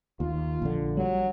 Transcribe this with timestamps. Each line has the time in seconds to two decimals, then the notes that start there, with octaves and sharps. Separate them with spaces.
0.20 D#2 F4
0.62 A#1 D3
0.97 F#3 G3